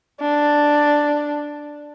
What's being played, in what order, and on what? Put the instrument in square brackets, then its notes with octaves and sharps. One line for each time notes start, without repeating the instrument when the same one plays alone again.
[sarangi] D4